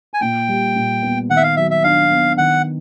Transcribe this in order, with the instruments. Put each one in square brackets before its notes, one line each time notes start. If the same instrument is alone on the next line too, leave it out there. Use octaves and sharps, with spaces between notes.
[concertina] G#5
[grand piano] A#2 [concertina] G5
[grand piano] G3
A#2
B3
[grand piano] D#3 [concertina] F#5
[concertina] E5
F5
[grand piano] F#3 [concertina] E5
[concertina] E5
[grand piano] D4 [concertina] F5
[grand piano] B3
[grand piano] D#3 [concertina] F#5